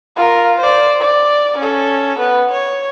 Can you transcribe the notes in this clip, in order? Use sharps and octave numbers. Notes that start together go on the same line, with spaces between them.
F4 A#4
C5 D5
D5
C#4 A4
B3 B4
C#5